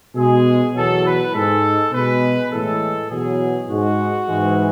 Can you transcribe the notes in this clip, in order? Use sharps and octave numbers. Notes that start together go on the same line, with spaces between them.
B2 G#3 G#4
E2 B2 F#3 A4
B4
G#2 G#3 A4
B2 G#3 B4
A2 E3 G#3 A4
E2 B2 F#3 G#4
G#2 G#3 F#4
G#2 E3 G#3